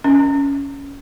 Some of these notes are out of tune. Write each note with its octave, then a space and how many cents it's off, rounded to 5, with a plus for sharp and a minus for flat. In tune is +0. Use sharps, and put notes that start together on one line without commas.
C#4 +10